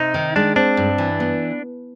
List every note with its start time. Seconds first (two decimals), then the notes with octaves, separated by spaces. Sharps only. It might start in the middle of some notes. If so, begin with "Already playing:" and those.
Already playing: C3 D#4
0.14 D#3
0.36 G#3 D4
0.56 C4 D4
0.77 G2
0.98 E3
1.20 B3